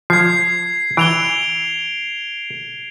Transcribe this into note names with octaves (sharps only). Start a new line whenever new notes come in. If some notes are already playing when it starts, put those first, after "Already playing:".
F3 G#6 C7
E3 D7 F7 G7